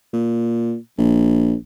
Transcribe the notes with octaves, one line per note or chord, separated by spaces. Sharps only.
A#2
A#1